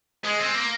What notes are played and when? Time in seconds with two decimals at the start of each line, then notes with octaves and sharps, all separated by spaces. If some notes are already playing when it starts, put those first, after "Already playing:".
0.24 G#3
0.40 C4
0.55 A#3